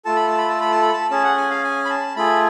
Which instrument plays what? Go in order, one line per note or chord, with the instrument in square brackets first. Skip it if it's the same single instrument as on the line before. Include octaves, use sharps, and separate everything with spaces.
[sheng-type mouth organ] A3 F4 A4 A5
B5
A5
B5
A5
B5
A5
B5
A5
C#4 G#4 A5
F#5
G#5
F5
G#5
B5
A5
A3 F4 G#4 B5